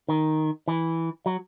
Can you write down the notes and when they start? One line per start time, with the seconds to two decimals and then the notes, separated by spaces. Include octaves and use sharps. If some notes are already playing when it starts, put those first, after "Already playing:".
0.09 D#3
0.68 E3
1.26 F#3